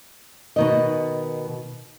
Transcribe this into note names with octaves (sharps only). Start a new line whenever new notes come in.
B2 D#3 D#5